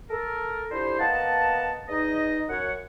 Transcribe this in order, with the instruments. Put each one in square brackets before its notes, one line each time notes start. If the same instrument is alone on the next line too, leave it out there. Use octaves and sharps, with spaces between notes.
[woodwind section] A4 A#4
D3 F3 E4 G4 C5
A#3 B3 D#5 F#5 A5
E2 E3 D#4 G#4 D#5
F#2 C#5 F#5